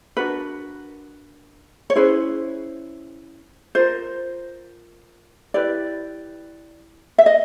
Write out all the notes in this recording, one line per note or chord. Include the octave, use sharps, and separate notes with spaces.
D4 F#4 A#4 B4
C#5
C#4 E4 G#4 B4 C5
F4 A#4 C5
E4 G4 B4 D5
E5
D#5